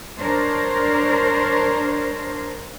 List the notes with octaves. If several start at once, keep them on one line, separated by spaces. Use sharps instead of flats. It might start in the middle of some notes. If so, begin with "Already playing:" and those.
D4 A#4 C5 C#5